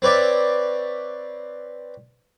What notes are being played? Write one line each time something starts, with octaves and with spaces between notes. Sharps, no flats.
C4 B4 C#5 D5 E5